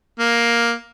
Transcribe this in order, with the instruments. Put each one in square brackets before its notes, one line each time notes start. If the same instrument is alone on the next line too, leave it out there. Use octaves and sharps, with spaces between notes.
[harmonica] A#3